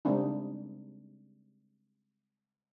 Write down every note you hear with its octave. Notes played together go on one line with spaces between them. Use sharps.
C#3 G3 G#3 C4 D4 D#4